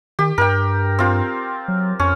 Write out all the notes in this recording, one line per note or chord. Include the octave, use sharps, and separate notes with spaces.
D#3 G4
G2 A#4 G5
C4 F4
F#3
F2 C#4